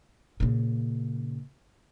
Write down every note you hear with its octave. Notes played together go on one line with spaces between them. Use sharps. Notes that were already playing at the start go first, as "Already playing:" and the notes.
A#2 C#3